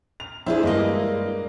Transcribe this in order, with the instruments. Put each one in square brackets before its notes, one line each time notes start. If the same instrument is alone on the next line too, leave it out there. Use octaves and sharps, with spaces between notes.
[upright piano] F7
[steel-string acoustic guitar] D4 E4 G#4 [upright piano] C5 E5
[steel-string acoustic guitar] G2 B4 D#5 [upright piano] G#3 A#3